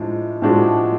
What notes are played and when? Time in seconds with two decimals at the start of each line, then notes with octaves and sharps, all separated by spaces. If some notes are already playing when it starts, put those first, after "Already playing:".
Already playing: A2 F3 G#3 D4
0.42 A2 F3 G#3 D4 F#4